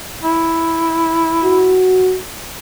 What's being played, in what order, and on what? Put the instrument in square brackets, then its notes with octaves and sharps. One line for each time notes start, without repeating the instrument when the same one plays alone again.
[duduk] E4
[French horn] F#4